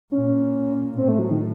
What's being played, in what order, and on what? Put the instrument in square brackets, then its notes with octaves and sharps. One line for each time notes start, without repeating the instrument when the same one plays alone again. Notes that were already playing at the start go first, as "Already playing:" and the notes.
[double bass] A#2 [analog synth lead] C#4
[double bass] A2 [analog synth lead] C4
[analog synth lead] A3
F#3
D#3